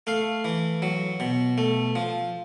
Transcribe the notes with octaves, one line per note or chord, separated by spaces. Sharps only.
A3 F5
E3
F#3
B2
A3
F3